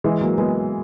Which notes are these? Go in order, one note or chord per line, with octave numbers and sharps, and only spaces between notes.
E3 G#3
F#3 A#3
G#3 B3